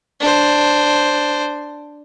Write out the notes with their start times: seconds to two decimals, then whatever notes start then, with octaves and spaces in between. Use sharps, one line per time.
0.20 D4 C5